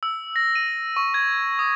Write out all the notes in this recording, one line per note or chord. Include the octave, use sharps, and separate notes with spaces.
E6
A#6
D#7
C#6
G#6
D#6